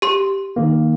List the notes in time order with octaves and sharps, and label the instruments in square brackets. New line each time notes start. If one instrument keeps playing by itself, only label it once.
[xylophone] G4 C6
[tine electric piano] D#3 A#3